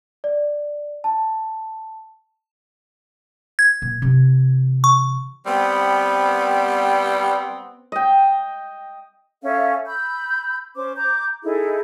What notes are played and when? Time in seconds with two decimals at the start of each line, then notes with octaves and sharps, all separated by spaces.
0.24 D5
1.04 A5
3.59 G#6
3.82 A#2
4.02 C3 E3
4.84 C#6
5.46 G3 B3 C4
7.92 D#5 G5
9.42 C#4 A4 E5 F5
9.86 B5 E6 G6
10.75 C#4 C5 D6
10.97 A#5 D6 G6
11.43 D#4 E4 G#4 A4